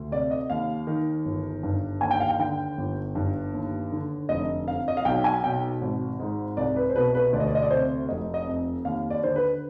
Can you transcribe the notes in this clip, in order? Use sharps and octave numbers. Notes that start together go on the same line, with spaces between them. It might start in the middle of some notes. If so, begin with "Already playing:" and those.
Already playing: D2
C3 D5
D#5
D#2 F5
D#3
G1
G2
D#2 G#5
G5
F5
G5
D3 G5
G1
G2
D#2
D3
F1 D#5
F2 F5
D#5
F5
B1 G5
G#5
B2 G5
G#1
G#2
C2 D5
B4
C5
B2 B4
B4
D2 D5
D#5
D5
D#5
D5
C3 C5
F1 D#5
D#5
F2
D#2 F5
D5
D3 C5
B4